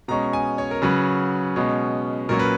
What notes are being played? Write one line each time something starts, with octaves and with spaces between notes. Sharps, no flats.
B2 G#3 C#4 A#5
G#5
C#5
A#4
C#3 F#3 C#4 B4
B2 G#3 C#4
A#2 F#3 C#4 A#4
B4